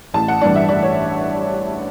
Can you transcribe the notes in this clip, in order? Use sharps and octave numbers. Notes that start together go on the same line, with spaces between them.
A1 A5
F#5
G2 E3 G3 D4 D5
E5
A1 D5
C#5